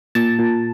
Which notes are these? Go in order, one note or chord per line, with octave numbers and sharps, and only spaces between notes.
A#2 A5
A#2